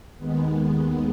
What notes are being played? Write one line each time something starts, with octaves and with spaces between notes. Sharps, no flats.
D#2 D#3 G#3 B3